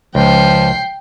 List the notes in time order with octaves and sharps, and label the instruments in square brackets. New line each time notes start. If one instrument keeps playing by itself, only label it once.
[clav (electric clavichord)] C#2 [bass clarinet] F3 [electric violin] G5 C7